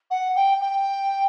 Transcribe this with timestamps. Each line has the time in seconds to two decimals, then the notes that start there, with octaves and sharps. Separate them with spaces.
0.10 F#5
0.35 G5
0.61 G5